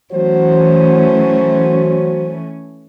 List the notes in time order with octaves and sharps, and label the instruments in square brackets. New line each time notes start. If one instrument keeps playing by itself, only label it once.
[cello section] E3 A3 C#4 [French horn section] F#3 F#4 C5